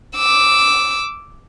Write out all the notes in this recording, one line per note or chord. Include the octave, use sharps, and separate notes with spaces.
D6 E6